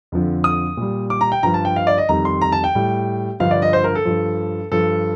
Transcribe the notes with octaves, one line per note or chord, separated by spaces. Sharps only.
F2 D3 F3
D#6
A#2 G3
D6
A#5
G5
G2 F3 A#5
A5
G5
F5
D5
D#5
F2 D#3 G3 A#5
C6
A#5
A5
G5
A2 G3
G2 D3 F3 F5
D5
D#5
C5
A#4
A4
G2 F3
G2 F3 A4